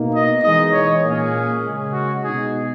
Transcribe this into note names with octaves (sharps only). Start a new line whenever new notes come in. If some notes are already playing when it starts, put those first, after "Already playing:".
Already playing: B2 A#3 D#4
D#5
E3 G#3 D#4 D#5
C#5
A#2 A#3 C#4 G#4
C#3 G#3 C#4
F#4
B2 G#3 D#4 G#4